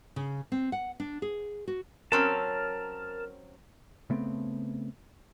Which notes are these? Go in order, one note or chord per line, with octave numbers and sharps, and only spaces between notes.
C#3
C4
F#5
D4
G#4
F#4
F#3 C4 C#4 A#4 A5 F6
C#3 A3 B3 C4